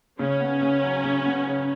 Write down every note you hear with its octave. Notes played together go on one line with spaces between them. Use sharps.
C#3 C#4
B3
C#3
F#3
C#3
B3
C#3